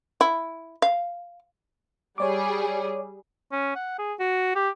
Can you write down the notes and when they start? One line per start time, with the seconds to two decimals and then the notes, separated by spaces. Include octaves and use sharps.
0.21 E4
0.82 F5
2.18 G3 G#4 C#5 D5 D6
3.52 C#4
3.76 F#5
3.99 G#4
4.20 F#4
4.55 G4